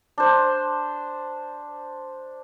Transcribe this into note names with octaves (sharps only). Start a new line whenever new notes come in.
D4 C5